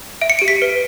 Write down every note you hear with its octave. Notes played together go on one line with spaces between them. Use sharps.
E5 D7
C#7
G4 D7
B6
B4